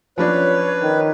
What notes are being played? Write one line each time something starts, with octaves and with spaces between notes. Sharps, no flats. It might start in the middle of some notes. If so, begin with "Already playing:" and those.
F3 C#4 D4 B4 C#5
D#3